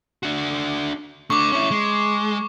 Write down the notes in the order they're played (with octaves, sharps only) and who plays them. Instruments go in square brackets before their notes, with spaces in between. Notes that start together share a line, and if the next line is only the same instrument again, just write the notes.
[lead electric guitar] D4 F#4
[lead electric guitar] A3 D4 [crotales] C#6 D6
[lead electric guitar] C#4 E4
G#3